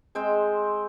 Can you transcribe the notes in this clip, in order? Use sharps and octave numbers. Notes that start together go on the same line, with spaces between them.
G#3 C4 C5 G5